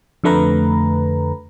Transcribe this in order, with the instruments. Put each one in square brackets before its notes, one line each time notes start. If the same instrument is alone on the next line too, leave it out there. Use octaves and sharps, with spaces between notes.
[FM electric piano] F2 D3 A3 B4 A#5